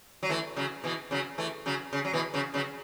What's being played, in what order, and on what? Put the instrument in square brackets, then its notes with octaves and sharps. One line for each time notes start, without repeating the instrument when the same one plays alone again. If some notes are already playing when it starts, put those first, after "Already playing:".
[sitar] F#3
E3 A3
C#3 F#3
B2 E3
C#3 F#3
E3 A3
C#3 F#3
C#3
F#3
B2 E3
C#3 F#3
C#3 F#3